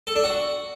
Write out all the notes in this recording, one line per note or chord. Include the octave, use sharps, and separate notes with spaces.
A4
D4
F#4